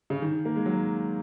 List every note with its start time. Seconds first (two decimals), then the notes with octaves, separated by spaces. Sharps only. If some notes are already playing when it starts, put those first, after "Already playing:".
0.10 C#3
0.22 D#3
0.45 A#3
0.56 G#3
0.66 F#3